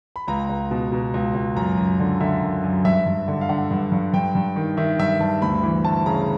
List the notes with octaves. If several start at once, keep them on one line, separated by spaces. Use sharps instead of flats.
B5
C#2 A#5
C#2
B2
B2
C#2
C#2
F#2 A#5
F#2
D3
D3 E5
F#2
F#2
G2 E5
G2
D3
F5
D3 F#5
G2
G2
G2 G5
G2
D#3
D#3 E5
G2 E5
G2 A5
D2 B5
E3
D2 A5
C#3 A#5